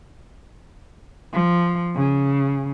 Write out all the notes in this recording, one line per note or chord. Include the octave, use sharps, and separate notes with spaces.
F3
C#3